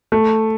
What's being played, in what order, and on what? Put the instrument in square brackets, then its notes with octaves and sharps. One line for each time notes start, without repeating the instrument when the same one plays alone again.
[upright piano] A3